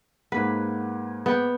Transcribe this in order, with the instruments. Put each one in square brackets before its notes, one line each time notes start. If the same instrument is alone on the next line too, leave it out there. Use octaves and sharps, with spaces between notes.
[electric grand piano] G#2 A#3 F#5 [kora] B4
[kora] B3 G5